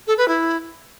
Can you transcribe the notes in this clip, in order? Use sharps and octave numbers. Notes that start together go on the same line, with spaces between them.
A4
B4
E4